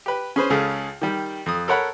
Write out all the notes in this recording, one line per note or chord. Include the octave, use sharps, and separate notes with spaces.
G4 B4
C#4 G#4 B4 C5
C#2 C#3 G#4 A4
D#3 G3
F2 D#6
A4 A#4 C#5 F#5 B5